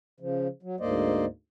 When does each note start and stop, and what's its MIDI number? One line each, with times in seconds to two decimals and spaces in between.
0.20 0.48 49
0.20 0.48 53
0.63 0.76 54
0.80 1.25 38
0.80 1.25 44
0.80 1.25 58
0.80 1.25 72
0.80 1.25 74
0.80 1.25 75